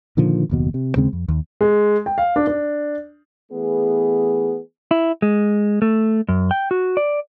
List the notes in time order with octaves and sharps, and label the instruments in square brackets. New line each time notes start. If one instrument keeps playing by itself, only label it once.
[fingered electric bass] A#2 D3 D#3 F3
F#1 D#2 B2
C3
D#2 C#3 G#3 C4
F2
D#2
[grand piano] G#3
G5
F5
D4
D4
[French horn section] E3 A3 B3 G#4
[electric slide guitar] E4
G#3
A3
F#2
G5
F#4
D5